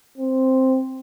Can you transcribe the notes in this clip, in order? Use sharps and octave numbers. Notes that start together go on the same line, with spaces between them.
C4